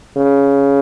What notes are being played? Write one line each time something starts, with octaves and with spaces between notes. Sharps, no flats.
C#3